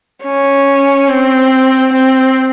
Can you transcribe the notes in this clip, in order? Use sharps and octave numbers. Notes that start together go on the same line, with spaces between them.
C#4
C4
C4